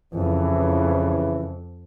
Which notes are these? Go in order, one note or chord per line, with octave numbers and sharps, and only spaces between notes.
F2 C#3 E3